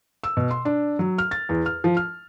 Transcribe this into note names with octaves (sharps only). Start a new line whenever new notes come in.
E6
B2
C6
D4
F#3
F6
A6
E2
F6
F3
F6